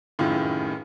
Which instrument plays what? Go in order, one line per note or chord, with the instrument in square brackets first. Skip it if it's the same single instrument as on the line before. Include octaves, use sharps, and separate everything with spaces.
[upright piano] F1 F#2 A2 D#3 F4 G#4